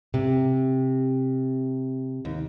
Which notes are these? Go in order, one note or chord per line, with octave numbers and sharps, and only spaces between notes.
C3
D#2